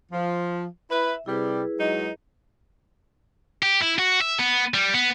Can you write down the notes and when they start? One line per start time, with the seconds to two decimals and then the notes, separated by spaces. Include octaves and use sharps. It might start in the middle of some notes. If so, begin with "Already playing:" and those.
0.11 F3
0.90 E4 B4 E5
1.26 C3 G3 E4 G#4 B4
1.78 F#3 G#3 D#4
3.63 G4
3.82 E4
3.99 F#4
4.22 E5
4.39 B3
4.74 G3
4.94 B3